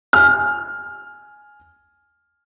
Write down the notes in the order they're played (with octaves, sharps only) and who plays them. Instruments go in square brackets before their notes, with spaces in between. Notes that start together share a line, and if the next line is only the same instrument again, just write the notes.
[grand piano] G#5 F6